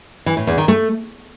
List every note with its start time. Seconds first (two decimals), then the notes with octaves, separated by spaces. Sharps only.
0.26 E3
0.37 A2
0.47 E2
0.58 D#3
0.68 A3